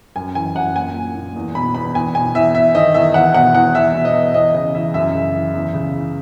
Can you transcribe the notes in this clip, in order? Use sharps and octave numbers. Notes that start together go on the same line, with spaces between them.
F#2 G#5
E3 G#5
F#2 F#5
A#2 G#5
A#2
A#2
E2
B2 B5
E2 B5
E2 G#5
B2 G#5
E2 E5
E2 E5
D#3 D#5
E2 E5
E2 F#5
B2 F#5
E2 F#5
E2 E5
B2
D#5
E2
E2 D#5
C#3 D#5
E3 E5
F#2 E5
C#3
E3
E2
C#3
E3